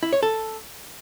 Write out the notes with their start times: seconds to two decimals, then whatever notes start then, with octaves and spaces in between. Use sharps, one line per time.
0.03 E4
0.13 C#5
0.23 A4